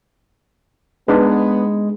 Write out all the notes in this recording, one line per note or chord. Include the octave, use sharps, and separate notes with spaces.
G#3 B3 D4 D#4 B4